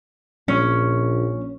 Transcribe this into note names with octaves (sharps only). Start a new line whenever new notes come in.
A#1 C#4